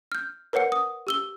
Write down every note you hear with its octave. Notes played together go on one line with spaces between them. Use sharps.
F6 G6
A#4 B4 C#5 F#5 C#7
D#6
G4 E6 G7